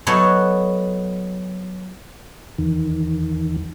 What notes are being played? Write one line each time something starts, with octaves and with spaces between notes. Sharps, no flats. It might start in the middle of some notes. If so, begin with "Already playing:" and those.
F#3 B3 D#4 A4 C#5
E2 D#3